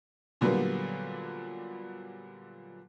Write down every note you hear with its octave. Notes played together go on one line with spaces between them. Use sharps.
A#2 D3 F#3 G3 A#3 B3